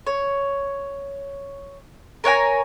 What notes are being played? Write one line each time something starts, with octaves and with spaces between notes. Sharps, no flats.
C#5
A#4 C#5 F#5 G#5